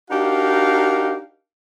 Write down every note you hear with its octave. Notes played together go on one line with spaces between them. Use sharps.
D4 D#4 F#4 G4 A#4 F5